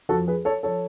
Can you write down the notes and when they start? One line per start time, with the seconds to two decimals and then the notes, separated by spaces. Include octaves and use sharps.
0.09 F2 F3 F#4 A4
0.27 G#4 B4
0.45 A4 C#5
0.63 F3 A4 C#5